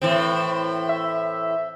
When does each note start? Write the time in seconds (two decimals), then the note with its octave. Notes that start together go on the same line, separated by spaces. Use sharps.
0.01 A2 E3 C4
0.89 E5